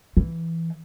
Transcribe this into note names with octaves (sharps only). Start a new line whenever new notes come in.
E3